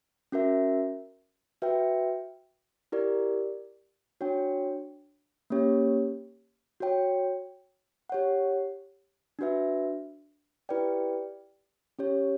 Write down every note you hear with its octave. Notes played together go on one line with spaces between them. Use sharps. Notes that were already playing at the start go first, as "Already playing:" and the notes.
C#4 F#4 A#4 E5
F#4 B4 E5 G5
E4 G4 A#4 D5
D4 F#4 C#5 G5
A#3 C#4 G4 C#5
F#4 C#5 G5
G4 C#5 F#5
D4 F#4 B4 E5
E4 G4 B4 D5 G5
C#4 G4 C#5